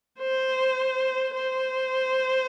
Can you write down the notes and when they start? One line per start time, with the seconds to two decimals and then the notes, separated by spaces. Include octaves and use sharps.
0.20 C5
1.34 C5